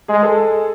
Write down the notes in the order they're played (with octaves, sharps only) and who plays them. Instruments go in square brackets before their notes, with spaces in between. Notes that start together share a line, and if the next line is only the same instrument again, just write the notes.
[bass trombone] G#3 [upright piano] G#4
[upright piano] A4